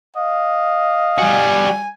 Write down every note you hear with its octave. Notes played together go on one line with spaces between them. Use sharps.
D#5 F5
G3 F#4 G#5